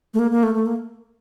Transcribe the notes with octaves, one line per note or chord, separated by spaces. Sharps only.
A3
A#3
A#3
A3
A3
A#3